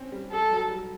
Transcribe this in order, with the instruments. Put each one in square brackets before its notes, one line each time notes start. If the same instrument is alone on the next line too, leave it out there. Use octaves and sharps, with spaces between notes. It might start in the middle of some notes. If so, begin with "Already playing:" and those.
Already playing: [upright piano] C4 C#4
G3
[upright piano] G3 [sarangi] A4
[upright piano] F#3
G3